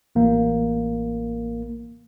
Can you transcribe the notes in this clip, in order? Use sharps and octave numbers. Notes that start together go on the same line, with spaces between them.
A1 A#3